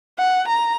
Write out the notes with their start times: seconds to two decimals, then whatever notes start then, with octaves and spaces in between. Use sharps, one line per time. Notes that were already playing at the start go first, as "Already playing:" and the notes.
0.19 F#5
0.48 A#5